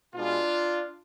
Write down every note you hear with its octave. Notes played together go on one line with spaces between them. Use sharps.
B2 G#3 D4 F4